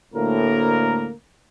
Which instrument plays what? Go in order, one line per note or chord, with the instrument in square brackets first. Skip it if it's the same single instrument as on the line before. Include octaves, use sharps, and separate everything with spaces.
[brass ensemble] D2 A2 A#3 A#4